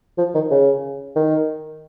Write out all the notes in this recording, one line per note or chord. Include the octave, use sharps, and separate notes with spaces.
F3
D#3
C#3
D#3